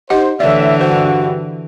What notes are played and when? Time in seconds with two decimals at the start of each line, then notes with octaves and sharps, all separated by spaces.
0.10 D#4 G4 C5 D#5 F#5
0.40 A2 D3 E3 C#5 D5 E5
0.81 G2 F#4 C5